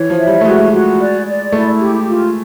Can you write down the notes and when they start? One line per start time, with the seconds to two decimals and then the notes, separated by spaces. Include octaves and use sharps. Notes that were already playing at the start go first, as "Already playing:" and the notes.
Already playing: E3 C#5
0.10 F3
0.18 E5
0.27 G3
0.41 A3
0.45 G#3 F#4
0.72 F#4
1.00 D5
1.26 D5
1.52 A3 E4
1.80 G4
2.07 F4